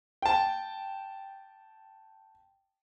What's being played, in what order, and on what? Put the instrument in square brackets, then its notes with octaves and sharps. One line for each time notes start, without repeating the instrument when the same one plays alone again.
[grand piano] G5 A5